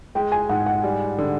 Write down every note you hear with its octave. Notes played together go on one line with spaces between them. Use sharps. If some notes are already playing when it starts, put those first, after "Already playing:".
G#3 G5
G#5
G#2 F#5
F#5
G3
D3